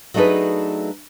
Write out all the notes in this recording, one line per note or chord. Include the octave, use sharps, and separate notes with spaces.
F#3 A3 D4 D#4 G#4 B4